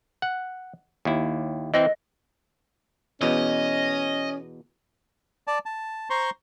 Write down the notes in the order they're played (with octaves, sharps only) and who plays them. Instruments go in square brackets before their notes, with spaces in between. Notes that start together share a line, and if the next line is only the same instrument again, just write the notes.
[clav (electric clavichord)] F#5
D#2 E4
[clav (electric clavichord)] E3 C4 [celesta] D#5 A#6
[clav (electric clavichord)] E2 B2 [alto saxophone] C#4 [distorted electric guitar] D#5
[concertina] D5 A5
A5
C5 A#5 C6 C#6